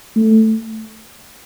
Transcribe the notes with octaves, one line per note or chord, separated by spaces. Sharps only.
A3